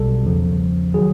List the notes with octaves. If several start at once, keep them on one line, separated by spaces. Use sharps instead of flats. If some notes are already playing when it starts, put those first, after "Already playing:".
Already playing: B1 B2 G3 A4
E2 C#3 F3
D#3 F#3 G#4